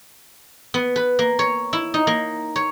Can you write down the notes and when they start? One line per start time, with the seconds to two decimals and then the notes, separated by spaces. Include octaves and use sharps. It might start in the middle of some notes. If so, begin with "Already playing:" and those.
0.74 B3
0.96 B4
1.19 A#3
1.39 C#5
1.73 E4
1.94 D#4
2.07 A#3
2.56 C#5